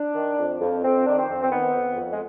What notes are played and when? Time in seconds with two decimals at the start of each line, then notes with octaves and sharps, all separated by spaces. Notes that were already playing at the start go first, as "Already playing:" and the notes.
Already playing: D4
0.16 D#3
0.39 F2
0.61 F2
0.84 F2 C4
1.06 D#3 D4
1.18 C4
1.29 F2
1.43 C4
1.52 D#3 B3
1.74 F2
1.98 F2
2.12 G#3